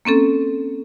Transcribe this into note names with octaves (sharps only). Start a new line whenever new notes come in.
A#3 C4 C#4 A4